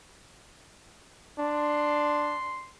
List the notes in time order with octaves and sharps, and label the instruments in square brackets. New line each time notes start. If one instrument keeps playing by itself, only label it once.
[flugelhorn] D4 [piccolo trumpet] C6